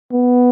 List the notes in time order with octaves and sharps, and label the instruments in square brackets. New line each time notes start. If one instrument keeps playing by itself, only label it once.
[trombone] B3